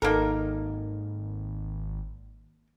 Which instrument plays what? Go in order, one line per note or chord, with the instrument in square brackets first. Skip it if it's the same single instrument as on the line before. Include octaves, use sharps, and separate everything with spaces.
[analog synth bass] G#1 [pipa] A#3 A#4 [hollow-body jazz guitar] D#4 A4